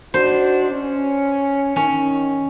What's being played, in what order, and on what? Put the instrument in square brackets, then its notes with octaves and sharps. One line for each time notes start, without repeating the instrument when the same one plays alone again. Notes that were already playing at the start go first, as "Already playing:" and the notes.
[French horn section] D4 D#4 F#4 [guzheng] C5
[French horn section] C#4
[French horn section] D#3 [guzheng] C#4